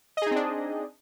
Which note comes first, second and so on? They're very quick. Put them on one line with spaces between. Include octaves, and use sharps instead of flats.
D#5 G#4 D#4 C4 D4